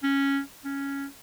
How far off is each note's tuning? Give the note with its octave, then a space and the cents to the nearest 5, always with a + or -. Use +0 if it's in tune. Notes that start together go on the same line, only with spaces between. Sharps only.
C#4 -5
C#4 +0